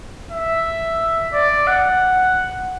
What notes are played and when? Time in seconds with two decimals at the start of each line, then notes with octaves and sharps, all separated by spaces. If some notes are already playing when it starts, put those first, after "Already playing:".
0.30 E5
1.33 D5
1.67 F#5